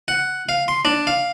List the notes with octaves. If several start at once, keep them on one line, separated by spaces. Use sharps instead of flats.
F#5
F5
C6
D4
F5